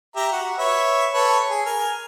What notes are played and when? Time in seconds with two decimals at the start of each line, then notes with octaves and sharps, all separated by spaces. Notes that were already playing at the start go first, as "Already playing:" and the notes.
0.16 G4 E5 A#5
0.33 F#4
0.59 B4 C#5 E5
1.14 A4 B4 C#5
1.50 G#4
1.65 A#4 G#5